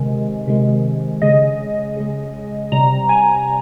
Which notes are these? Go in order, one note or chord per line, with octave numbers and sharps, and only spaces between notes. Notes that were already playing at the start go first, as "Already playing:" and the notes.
Already playing: C3 D#3 G#3
C3 D#3 G#3
C#3 G#3 D#5
C#3 G#3
C3 G3 A#5
G#5